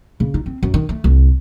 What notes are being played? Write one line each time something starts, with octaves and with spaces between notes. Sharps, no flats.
C#3
D#4
C4
F#2
D#3
A3
C2